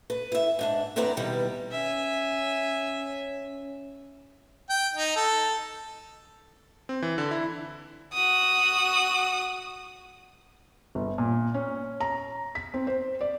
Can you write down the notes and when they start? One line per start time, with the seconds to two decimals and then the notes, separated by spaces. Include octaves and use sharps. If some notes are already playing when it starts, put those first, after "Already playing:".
0.10 B4
0.32 E4 E5
0.59 G#2 D4 E5
0.96 E2 C4 E4 B4 D5 A#5
1.17 B2 D#3 E3 G3
1.72 C#4 E5 G#5
4.69 G5
4.95 D#4
5.16 A4
6.89 C4
7.02 E3
7.18 D3
7.31 E4
8.14 F#4 D#6
10.95 G1
11.18 A#2
11.54 C#4
12.00 A#5
12.55 B6
12.74 C4
12.87 C5
13.21 D5